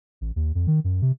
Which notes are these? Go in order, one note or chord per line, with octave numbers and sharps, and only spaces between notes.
A1
D#2
F2
D#3
F#2
C3